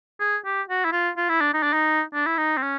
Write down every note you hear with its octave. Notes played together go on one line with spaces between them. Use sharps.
G#4
G4
F#4
E4
F4
F4
E4
D4
D#4
D4
D#4
D4
E4
D#4
C4
C#4